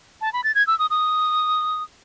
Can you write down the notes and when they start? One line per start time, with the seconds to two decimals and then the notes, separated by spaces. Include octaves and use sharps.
0.21 A5
0.33 B5
0.44 A6
0.55 G#6
0.67 E6
0.79 D#6
0.90 D#6